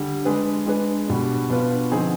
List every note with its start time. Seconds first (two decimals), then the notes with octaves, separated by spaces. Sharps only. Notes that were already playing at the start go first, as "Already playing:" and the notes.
Already playing: D3 G3
0.25 G#3 D4 G#4 B4
0.66 G#3 D4 G#4 B4
1.08 B2 G3 D4
1.49 B2 B3 D4 F4 B4
1.91 D3 F3 C4 D#4 G#4